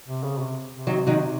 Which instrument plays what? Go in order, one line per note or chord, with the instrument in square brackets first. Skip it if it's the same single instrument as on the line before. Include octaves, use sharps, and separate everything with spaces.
[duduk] C3
C#3
C3
C3
[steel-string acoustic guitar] D#3 F#3
D#3 F#3